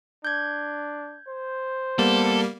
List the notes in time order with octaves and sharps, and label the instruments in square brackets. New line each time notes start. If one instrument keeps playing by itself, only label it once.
[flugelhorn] D4 [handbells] G6 G#6
[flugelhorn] C5
[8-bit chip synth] G3 A#3 [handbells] B3 [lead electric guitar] A4